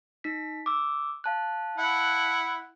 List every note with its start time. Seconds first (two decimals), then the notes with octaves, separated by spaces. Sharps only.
0.24 D#4 B6
0.66 D6 E6
1.24 F5 A5 F#6
1.78 E4 F#5